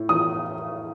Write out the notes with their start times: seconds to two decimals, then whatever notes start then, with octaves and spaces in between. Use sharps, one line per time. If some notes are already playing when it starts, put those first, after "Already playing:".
Already playing: A2
0.09 E3 D#6